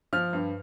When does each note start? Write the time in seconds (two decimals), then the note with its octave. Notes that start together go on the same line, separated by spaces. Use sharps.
0.13 F3 F6
0.33 G2